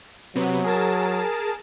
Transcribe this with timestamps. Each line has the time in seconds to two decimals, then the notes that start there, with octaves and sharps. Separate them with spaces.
0.35 C3 F#3 B3
0.65 G#4 A#4 A5